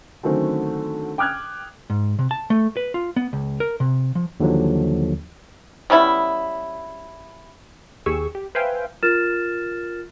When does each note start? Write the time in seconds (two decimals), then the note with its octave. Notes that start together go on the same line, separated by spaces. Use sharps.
0.23 D3 D#3 F#3 A3 C4 C#4
1.18 G5 D6 D#6 F6 F#6 G#6
1.90 G#2
2.19 C3
2.31 A5
2.50 A3
2.77 B4
2.94 F4
3.16 B3
3.33 C#2
3.60 A#4
3.80 C3
4.15 F3
4.40 D#2 D3 F3 F#3
5.90 G3 B3 C#4 E4
8.06 D#2 G4 G#4 C#6 E6
8.35 G4
8.55 B4 C5 E5 F5 G5 G#5
9.03 F4 A#4 F6 A6 E7